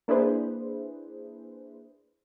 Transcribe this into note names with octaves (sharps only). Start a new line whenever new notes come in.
A#3 D4 E4 G#4 B4 C5